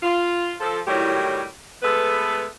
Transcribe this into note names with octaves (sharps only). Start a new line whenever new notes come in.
F4
F3 A4
A2 D#3 F#3 G3 E4 G4
G#3 A3 B3 A4 B4